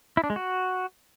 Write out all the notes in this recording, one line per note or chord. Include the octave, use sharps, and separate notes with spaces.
E4
D4
G#3
F#4